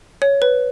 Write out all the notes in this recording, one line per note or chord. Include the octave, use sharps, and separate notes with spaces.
C#5
B4